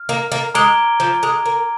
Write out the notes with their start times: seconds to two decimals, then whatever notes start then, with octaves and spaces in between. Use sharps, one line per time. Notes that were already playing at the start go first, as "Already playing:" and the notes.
Already playing: F6
0.09 A#3
0.32 A#3
0.54 G#3 A#5 D6 G#6 D7 G7
1.00 F3
1.23 G#3
1.46 A#3